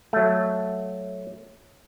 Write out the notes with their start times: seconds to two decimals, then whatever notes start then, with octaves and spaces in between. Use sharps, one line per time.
0.13 F#3 A3